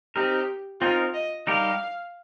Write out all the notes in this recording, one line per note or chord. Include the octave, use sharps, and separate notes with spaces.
C4 D#4 G4 A#4
C4 D#4 F4 A#4
D#5
G3 D#4 G4 A#4 F5